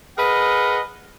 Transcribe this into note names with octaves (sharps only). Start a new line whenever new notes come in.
G#4 A#4 B4 D#5 F#5